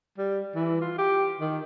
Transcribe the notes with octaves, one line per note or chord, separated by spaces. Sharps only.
G3
E3
F4
G4
D#3